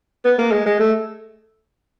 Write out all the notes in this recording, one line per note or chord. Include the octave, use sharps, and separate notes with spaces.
B3
A#3
G#3
G#3
A3